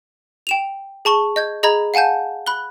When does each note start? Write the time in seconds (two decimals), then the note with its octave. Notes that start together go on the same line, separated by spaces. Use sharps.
0.47 G5 E7 F7
1.05 G#4 A5 C#6 G7
1.36 D#5 G6 G#6
1.63 G#4 D#5 A#5 B5 G#6
1.94 F5 F#5 G#5 A5 G6
2.46 B5 F#6 G7